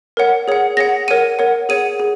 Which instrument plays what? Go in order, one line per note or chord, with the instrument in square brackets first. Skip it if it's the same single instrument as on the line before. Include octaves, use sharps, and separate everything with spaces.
[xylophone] A#4 C#5 F#5
G#4 C#5 F#5
G#4 C#5 F#5 A#6
A#4 C#5 F#5 D#7
A#4 C#5 F#5
G#4 C#5 F#5 D#7
G#4